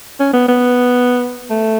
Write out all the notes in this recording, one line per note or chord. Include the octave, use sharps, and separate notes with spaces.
C#4
B3
B3
A3